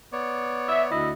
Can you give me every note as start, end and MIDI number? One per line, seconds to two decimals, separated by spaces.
0.13 0.90 59
0.13 0.90 73
0.13 0.90 74
0.69 0.82 76
0.90 1.11 38
0.90 1.11 64
0.90 1.11 75